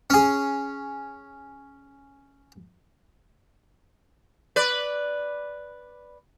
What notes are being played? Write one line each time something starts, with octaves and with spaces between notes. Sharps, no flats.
C#4 G#4
B4 D5